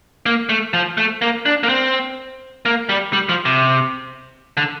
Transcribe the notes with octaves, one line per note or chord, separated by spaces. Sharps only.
A#3
A3
F3
A3
A#3
D4
A#3
C4
A#3
G3
G3
F3
C3
D3